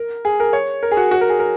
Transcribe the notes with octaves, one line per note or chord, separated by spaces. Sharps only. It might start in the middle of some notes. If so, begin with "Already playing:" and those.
Already playing: A#4
G#4
A#4
C#5
A#4
G#4
F#4
F#4
A#4
G#4
A#4